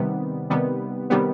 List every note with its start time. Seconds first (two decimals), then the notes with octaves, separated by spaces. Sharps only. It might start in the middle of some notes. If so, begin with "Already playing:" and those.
Already playing: C3 D#3 G3 B3
0.50 C3 D#3 G3 B3
1.10 C3 D#3 G3 B3